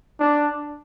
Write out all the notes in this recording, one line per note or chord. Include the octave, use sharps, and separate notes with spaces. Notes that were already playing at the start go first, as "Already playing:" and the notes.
D4